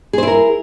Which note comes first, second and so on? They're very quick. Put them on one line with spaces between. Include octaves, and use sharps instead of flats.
G#4 C5 E4 A#4